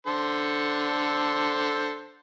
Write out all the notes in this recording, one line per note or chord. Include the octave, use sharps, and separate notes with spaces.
D3 A4 C5